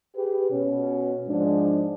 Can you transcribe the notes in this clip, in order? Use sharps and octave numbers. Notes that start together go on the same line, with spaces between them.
G4 G#4 B4
B2 C#4
G#2 F3 G#3 D4